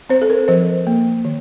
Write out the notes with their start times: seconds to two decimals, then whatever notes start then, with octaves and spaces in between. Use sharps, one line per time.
0.10 C4 C5
0.22 A4
0.30 A#4
0.48 F3 C5
0.87 A#3
1.25 D#3